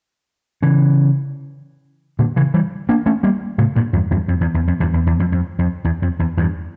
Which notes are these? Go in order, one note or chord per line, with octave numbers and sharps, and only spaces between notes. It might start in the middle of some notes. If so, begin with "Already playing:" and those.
C#3 E3
A#2 D3
C#3 E3
E3 G3
A#3 D4
A3 C#4
G3 A#3
A2 C#3
G2 A#2
E2 G2
E2 G2
F2
E2
E2
F2
E2 G2
E2
E2
F2
F2
F2
E2
F2
E2
E2 G2